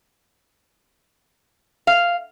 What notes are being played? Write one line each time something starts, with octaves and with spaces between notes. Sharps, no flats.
F5